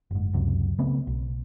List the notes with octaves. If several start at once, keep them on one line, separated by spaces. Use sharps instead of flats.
F#1 G#2
C#2 F#2 C3
C#3 A3 B3 C4
B1